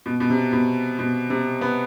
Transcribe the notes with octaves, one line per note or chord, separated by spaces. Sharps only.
B2
B2
C3
B2
B2
C3
B3